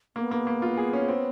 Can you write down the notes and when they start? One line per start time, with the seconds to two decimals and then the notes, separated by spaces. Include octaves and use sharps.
0.16 A#3 B3
0.31 A#3
0.47 A#3
0.62 F4
0.77 G#4
0.93 C#4
1.08 C4